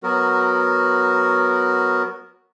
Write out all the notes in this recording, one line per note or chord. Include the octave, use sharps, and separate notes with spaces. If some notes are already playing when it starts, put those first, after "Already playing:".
F#3 B3 F#4 A#4